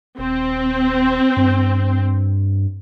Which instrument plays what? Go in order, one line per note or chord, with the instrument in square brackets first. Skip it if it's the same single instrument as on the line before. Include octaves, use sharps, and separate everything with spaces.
[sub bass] D#1 [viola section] C4
[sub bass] G2